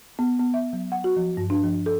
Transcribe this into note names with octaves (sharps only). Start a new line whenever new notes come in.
B3
B3
E5
F#3
F#5
F#4
F3
G2
D4
F3
A4